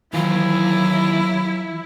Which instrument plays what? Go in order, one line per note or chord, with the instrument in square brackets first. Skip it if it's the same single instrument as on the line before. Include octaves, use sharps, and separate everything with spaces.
[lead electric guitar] D#2 [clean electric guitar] E3 F4 [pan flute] F#3 [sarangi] E4